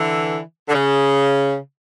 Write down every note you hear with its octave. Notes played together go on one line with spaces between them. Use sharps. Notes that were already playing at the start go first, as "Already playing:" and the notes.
Already playing: D3 E3
D3
C#3